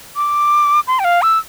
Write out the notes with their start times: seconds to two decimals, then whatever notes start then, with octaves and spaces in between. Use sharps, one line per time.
0.16 D6
0.87 C6
0.99 G5
1.04 F5
1.22 E6